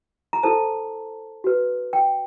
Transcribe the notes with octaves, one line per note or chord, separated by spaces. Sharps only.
A#5
E4 A4 C5 A5
F#4 B4
G5